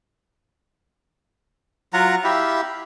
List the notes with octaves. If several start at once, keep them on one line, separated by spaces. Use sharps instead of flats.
F#3 F4 F#5 A#5
E4 G4 E5 F5